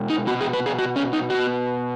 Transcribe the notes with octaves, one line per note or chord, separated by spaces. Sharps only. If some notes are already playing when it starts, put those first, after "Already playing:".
Already playing: B2 G#3
D#4
B2 B3 F#4
G#4
B4
G#4
F#4
C#4
D#4
B2 B3 F#4